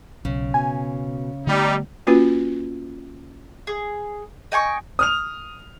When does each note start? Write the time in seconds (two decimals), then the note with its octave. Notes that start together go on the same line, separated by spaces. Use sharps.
0.25 B1 C#3
0.54 B2 G#5
1.47 D3 G3 A3 B3 D#4
2.07 A#3 C#4 F4 F#4 B4
3.67 G#4
4.52 D#5 G5 G#5 C#6
4.99 D#6 F6 F7